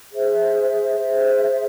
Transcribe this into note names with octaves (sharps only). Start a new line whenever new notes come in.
G#4 C5 E5
G#4 C5 E5